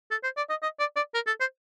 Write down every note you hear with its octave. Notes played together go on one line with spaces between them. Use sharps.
A4
C5
D5
D#5
D#5
D5
D5
A#4
A4
C5